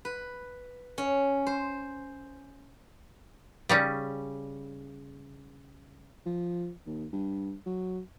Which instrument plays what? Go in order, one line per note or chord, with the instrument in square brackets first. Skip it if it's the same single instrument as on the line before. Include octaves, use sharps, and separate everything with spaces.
[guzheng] B4
C#4
C5
[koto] C#3 G3 C#4
[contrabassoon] F3
D#2
G2
F#3